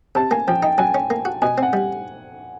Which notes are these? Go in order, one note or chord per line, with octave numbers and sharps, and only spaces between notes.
C3 A5
A#3 G#5
F3 G5
D#4 G5
F#3 G#5
C#4
A#3
F#4
B2 G#5
C4 F#5
G3